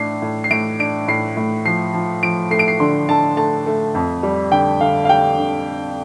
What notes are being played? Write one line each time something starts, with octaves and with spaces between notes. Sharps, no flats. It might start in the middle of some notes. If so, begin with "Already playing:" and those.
Already playing: A2 D4 C7
A2
C7
A2 D7
D4 D7
A2 C7
A2
F3 C7
F3
F3 D7
A3 C7
D7
C7
D3 C6
D3 A5
A3 A5
A3
F2
G3
D3 G5
D3 F5
F5
G3 G5
D3